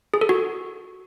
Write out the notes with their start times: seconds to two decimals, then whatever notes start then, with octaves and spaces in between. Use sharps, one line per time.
0.14 G#4
0.21 A4
0.29 F#4